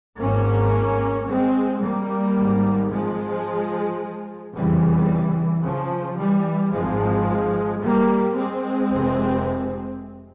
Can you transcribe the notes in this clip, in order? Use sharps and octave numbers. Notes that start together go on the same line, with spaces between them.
G#1 G#2 A#3 C#4
G#3 C4
G3 A#3
G#1 G#2
F3 G#3
F1 E2 C#3 E3 G3
C#3 F3
E3 G3
G#1 G#2 F3 G#3
G3 A#3
G#3 C4
F1 F2 C3